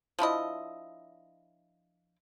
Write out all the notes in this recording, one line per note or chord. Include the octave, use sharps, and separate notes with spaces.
F3 D4 E4 D#5